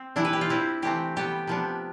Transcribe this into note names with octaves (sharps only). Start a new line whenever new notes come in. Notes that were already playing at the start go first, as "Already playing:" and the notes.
Already playing: C4
C3 E3 G3 D4 E4
B4
G4
F4
C3 G3 C4 E4
C3 E3 A3 C4 G4
C3 G3 B3 G4
C3 F3 B3 D4